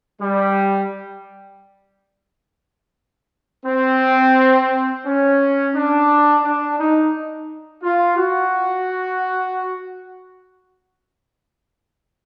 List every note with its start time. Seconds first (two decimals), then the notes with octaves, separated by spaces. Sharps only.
0.21 G3
3.66 C4
5.05 C#4
5.75 D4
6.43 D4
6.79 D#4
7.83 F4
8.17 F#4